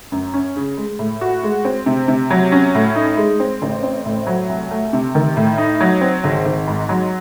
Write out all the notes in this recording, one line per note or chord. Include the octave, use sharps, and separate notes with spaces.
F#2
C#4
C#3
G#3
A2
F#4
G#3
C4
C3
C3
F#3
C#4
A2
D#4
G#3
C4
A1
C4
A2
F#3
C2
A3
C3
D#3
A2
D#4
F#3
C4
G#1
G#1
G#2
F#3